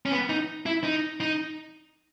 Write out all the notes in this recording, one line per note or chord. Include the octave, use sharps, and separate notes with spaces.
C#4
B3
D#4
E4
D#4
D#4